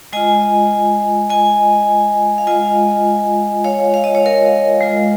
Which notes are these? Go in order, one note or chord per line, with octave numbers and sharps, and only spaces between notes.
G#3 F4 D#5 G#5
D#5 G#5
F5
G#3 F4 D#5 G#5
C#5 F5
F5
D#5
C#5
A#4 D#5
G#3 F4